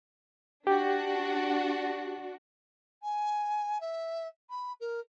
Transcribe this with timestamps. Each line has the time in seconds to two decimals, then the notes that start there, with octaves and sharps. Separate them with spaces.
0.67 D4 F#4 G4
3.01 G#5
3.80 E5
4.50 B5
4.80 A#4